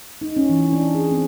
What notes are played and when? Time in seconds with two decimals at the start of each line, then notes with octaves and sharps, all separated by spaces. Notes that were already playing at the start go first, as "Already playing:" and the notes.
0.21 D#4
0.37 C#4
0.49 E3
0.73 D4
0.95 G#4
1.11 C4